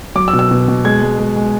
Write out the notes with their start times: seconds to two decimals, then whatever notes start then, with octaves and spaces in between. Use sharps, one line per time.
0.15 F#3 D6
0.28 E6
0.33 B2
0.39 E6
0.51 B2
0.68 B2
0.85 G#3 G#6
1.03 G#3
1.19 G#3
1.36 G#3